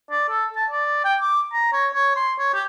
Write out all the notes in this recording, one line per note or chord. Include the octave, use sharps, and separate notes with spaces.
D5
A4
A5
D5
G5
D6
A#5
C#5
C#5
C6
C#5
G4